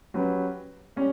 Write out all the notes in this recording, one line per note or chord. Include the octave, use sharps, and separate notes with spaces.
F#3 C#4 G4 B4
G3 C#4